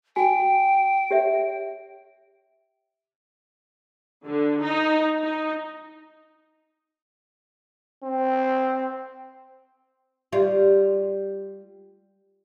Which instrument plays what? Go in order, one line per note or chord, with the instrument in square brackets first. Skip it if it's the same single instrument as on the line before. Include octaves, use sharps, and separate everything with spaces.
[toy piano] F#4 G#5 [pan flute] G5
[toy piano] G4 C#5 E5
[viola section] D3
D#4
D#4
[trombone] C4
[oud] G3 F4